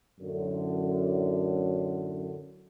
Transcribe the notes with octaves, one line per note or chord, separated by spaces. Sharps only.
F#2 A2 D3